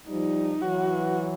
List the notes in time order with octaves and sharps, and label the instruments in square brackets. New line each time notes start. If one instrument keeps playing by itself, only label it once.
[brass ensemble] F3 G3 [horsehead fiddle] D#4
[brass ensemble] E3 F#3 [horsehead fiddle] F#4